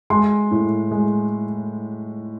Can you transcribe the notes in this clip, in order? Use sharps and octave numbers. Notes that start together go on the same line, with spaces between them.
G#3 C6
A2
G#3